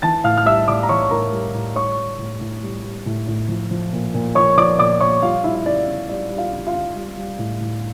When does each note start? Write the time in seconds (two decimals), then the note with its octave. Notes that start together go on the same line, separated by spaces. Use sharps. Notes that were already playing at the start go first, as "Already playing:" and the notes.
0.02 E3 A5 A6
0.24 A2 F5 F6
0.38 F6
0.45 G3 E5 E6
0.68 A2 D5 D6
0.83 A#5
0.89 E3 C#5 C#6
1.11 A2 A#4 A#5
1.32 G3
1.54 A2
1.76 G3 C#5 C#6
1.97 G3
2.19 A2
2.41 A2
2.63 G3
2.84 G3
3.06 A2
3.28 A2
3.49 F3
3.71 F3
3.93 A#2
4.14 A#2
4.35 F3 C#5 C#6
4.57 F3 D5 D6
4.79 A#2 D5 D6
5.01 A#2 C#5 C#6
5.23 G3 F4 F5
5.44 G3 E4 E5
5.55 E5
5.66 C#3 D5
5.87 C#3
6.09 G3 D5
6.30 G3
6.38 F4 F5
6.52 C#3
6.67 F4 F5
6.74 C#3
6.95 G3
7.17 G3
7.39 A2
7.61 A2